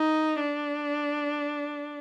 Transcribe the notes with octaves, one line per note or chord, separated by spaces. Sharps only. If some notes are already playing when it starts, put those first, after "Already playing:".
Already playing: D#4
D4